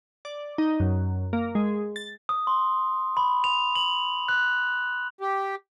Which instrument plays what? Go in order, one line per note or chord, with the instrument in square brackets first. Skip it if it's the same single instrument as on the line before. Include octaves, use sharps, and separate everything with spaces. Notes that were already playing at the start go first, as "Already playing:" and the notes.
[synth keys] D5
D#4
F#2
A#3
G#3
A6
[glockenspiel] D#6
C6
B5
F7
F#7
F#6
[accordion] G4